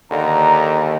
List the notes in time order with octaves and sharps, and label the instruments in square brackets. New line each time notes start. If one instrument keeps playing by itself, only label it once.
[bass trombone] D#2 [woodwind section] D3 A#5